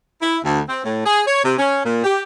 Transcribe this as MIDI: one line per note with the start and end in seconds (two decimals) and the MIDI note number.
0.22 0.39 64
0.45 0.60 38
0.68 0.83 60
0.84 1.03 45
1.05 1.21 68
1.26 1.40 73
1.44 1.54 48
1.58 1.81 61
1.84 2.01 46
2.04 2.22 67